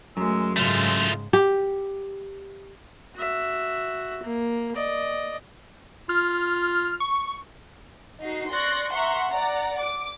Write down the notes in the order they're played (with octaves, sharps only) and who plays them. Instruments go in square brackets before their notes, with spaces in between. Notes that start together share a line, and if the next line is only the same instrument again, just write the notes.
[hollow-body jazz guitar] F#2 [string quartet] G#3 A3 E6
[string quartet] G#2 C#3 G#3 [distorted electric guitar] A3 F4
[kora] G4
[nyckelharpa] F#4 E5
A#3
D5 D#5
[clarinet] F4 [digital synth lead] F6
[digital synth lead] C#6
[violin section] D#4 F#4 C7
D5 C6 C#6 F#6 A#6
E5 F#5 A#5 C6 C#6
D5 F#5 A#5
D6